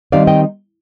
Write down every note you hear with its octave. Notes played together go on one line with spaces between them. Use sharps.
D#3 G3 C4 D#4 D5 F5
D#5 G5